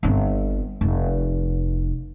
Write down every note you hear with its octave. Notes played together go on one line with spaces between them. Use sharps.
G1 C4
F1